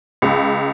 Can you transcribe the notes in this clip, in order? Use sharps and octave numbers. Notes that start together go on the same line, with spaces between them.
C#2